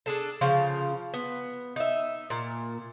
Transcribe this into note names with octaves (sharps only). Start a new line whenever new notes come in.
D4 G#4 A4
C#3 F3 F5
B3
D#4 E5
A#2